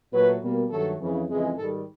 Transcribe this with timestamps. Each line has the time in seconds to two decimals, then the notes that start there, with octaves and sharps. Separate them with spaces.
0.11 A#2 F#3 A3 B4
0.41 B2 G3 A#3
0.69 G2 D#3 F#3 A3 A4
0.99 F2 C#3 E3
1.28 F2 C#3 E3 G#3
1.57 G#2 D#3 G3 A4